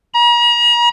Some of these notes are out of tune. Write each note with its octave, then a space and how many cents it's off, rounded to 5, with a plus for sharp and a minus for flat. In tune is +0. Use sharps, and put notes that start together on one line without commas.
A#5 +40